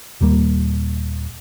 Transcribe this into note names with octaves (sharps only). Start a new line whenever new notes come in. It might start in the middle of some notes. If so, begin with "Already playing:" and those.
D#1 D#2 G3 A#3